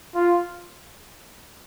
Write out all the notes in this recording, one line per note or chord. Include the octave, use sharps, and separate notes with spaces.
F4